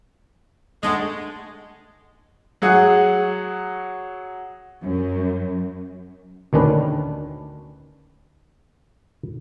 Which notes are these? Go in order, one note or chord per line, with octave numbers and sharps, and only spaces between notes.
G#3 A3 D4 F#5
F#3 G#4 F#5 D#6
F#2
D2 D#3 C#4 D4 B4